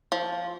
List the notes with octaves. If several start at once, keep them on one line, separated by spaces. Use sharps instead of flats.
F3